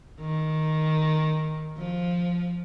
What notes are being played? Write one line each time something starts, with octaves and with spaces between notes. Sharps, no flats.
D#3
F3